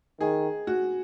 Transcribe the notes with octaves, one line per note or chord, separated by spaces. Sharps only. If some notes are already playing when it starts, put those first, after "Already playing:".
D#3 G#4
F#4